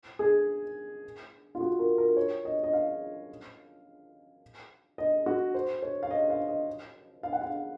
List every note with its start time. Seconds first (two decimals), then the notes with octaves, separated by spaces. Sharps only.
0.19 G#4
1.55 F4
1.61 F#4
1.79 A#4
1.98 A#4
2.17 C#5
2.45 D#5
2.64 D#5
2.73 F5
4.98 D#5
5.26 F#4
5.55 C5
5.82 C#5
6.03 F5
6.11 D#5
6.30 F5
6.48 D#5
7.23 F5
7.33 F#5
7.41 F5